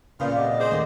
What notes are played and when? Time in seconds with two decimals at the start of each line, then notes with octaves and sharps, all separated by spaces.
0.20 A#2 C#3 F3 B3 F4 F5
0.36 C3 D5 D#5 F5 F#5 D6
0.59 G#4 C5
0.71 D#2 D#3 A3 A#3